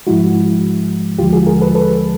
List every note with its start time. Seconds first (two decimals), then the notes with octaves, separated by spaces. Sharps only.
0.07 G#2 F3 G#3 E4 F#4
1.19 D#2 D3 F3 G#3 F4 G4
1.33 F#4 G#4
1.47 G#4 A#4
1.61 A4 B4
1.75 A4 B4